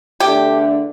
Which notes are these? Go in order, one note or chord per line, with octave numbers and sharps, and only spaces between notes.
E2 D3 A3 D4 G4